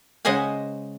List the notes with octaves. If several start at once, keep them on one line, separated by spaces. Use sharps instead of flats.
C#3 G#3 C5 D#5 F#5 G#5